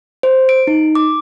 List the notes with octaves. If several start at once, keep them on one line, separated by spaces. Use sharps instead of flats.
C5
D7
D#4
D6